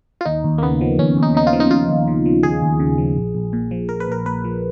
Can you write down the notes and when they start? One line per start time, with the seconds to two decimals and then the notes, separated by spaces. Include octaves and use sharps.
0.21 F4
0.25 D#2 D#4
0.44 D#2
0.58 A#3
0.62 C#3 B3
0.81 F3
0.99 D#2 C#4
1.17 D#2
1.23 D#4
1.34 C#3 D#4
1.47 F4
1.53 F3
1.60 D#4
1.71 D#2 F4
1.89 D#2
2.07 C#3
2.26 F3
2.43 D#2 G#4
2.62 D#2
2.80 C#3
2.98 F3
3.17 A#1
3.35 A#1
3.53 A#2
3.71 F3
3.89 A#1 A#4
4.00 B4
4.08 A#1 A#4
4.26 A#2 B4
4.44 F3